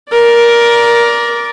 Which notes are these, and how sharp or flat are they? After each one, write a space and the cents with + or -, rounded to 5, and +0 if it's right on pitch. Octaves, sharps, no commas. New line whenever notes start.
A#4 +15 D5 -5